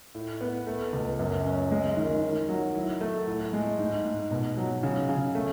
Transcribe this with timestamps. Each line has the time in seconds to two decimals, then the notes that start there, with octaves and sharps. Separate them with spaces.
0.15 A2
0.41 B3
0.67 A3
0.93 C#2
1.19 F#2
1.45 C#4
1.71 G#3
1.97 D#3
2.23 D#3
2.49 F#3
2.75 E4
3.01 A3
3.27 A2
3.53 G#3
3.79 G#2
4.05 G#2
4.31 B2
4.57 F#3
4.83 C#3
5.09 C#3
5.35 A3